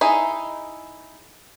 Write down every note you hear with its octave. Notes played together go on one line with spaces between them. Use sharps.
D#4 E4 G#4